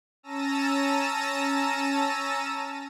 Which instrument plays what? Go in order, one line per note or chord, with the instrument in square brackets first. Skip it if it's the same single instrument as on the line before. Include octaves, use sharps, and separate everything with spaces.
[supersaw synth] C#4 A5 A#5 E6 A#6 D#7